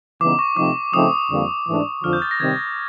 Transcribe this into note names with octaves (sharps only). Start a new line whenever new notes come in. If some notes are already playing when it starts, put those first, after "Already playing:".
C#3 E3 G3 B3 D#4 D6
C#6
C3 F3 A3 C4 D#4 D6
C#3 F3 A3 C4 D#4 D#6
F2 D3 G3 A#3
G#2 E3 A3 D4
F2 D3 F3 F6
G6
A6
A#6
C3 D#3 G3 C4 G#6